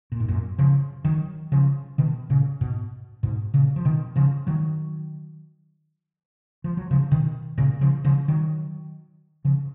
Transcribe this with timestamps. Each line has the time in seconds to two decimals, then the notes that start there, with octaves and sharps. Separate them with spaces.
0.12 A#2
0.20 G#2
0.28 F#2 A#2
0.58 C#3 F3
1.05 D#3 F#3
1.52 C#3 F3
1.98 B2 D#3
2.30 A#2 C#3
2.61 G#2 B2
3.23 G#2 B2
3.54 A#2 C#3
3.76 F3
3.85 B2 D#3
4.16 C#3 F3
4.47 D#3 F#3
6.64 F3
6.77 F#3
6.91 C#3 F3
7.11 B2 D#3
7.58 A#2 C#3
7.81 C#3 F3
8.04 C#3 F3
8.28 D#3 F#3
9.45 C#3 F3